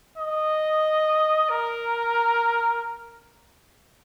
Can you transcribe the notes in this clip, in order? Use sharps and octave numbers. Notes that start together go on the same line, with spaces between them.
D#5
A#4